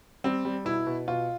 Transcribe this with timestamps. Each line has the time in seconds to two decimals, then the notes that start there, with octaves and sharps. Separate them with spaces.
0.24 G3 C4
0.45 G3
0.65 B2 E4
0.87 B2
1.08 B2 F4